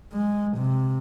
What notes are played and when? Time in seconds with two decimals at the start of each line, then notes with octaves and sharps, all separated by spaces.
0.13 G#3
0.58 C3